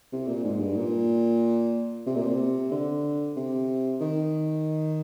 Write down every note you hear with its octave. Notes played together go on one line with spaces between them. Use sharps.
C3
A#2
G#2
G2
A#2
C3
A#2
C3
D3
C3
D#3